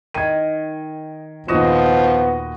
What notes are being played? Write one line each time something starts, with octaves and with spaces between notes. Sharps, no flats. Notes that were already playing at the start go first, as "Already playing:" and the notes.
D#3 G#6 D#7
D#2 A#2 F3 B3 F#4 D#5 E7